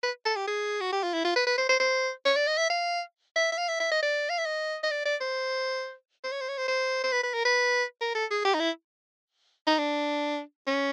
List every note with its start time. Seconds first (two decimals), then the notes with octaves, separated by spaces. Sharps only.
0.03 B4
0.25 A4
0.36 G4
0.48 G#4
0.81 F#4
0.92 G4
1.03 F4
1.14 E4
1.25 F4
1.36 B4
1.47 B4
1.58 C5
1.69 C5
1.80 C5
2.25 C#5
2.36 D5
2.47 D#5
2.58 E5
2.70 F5
3.36 E5
3.52 E5
3.58 F5
3.68 E5
3.80 E5
3.91 D#5
4.03 D5
4.29 F5
4.38 E5
4.46 D#5
4.83 D#5
4.91 D5
5.05 D5
5.21 C5
6.24 C5
6.32 C#5
6.41 C5
6.49 C#5
6.58 C5
6.68 C5
7.04 C5
7.12 B4
7.23 B4
7.34 A#4
7.45 B4
8.01 A#4
8.15 A4
8.31 G#4
8.45 G4
8.54 D#4
8.60 E4
9.67 D#4
9.78 D4
10.67 C#4